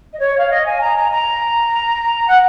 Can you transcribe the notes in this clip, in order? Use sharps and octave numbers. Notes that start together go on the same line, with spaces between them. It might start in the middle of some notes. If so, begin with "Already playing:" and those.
D#5
C#5
F5
D#5
G#5
A#5
A#5
A#5
F#5